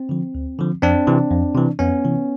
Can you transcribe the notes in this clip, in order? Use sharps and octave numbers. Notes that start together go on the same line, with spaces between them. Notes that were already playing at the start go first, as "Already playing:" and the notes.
Already playing: C4
D3 F3
D2
D3 F3
F2 C4 D4
C3 E3
F2
C3 E3
F2 B3 C#4
C3 E3